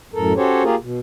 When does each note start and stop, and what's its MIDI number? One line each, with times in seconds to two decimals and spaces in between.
0.14 0.33 42
0.14 0.33 45
0.14 0.33 69
0.14 0.33 70
0.36 0.63 61
0.36 0.63 66
0.36 0.63 67
0.36 0.63 69
0.36 0.63 72
0.36 0.63 73
0.63 0.75 58
0.63 0.75 65
0.63 0.75 67
0.63 0.75 68
0.63 0.75 70
0.81 1.00 47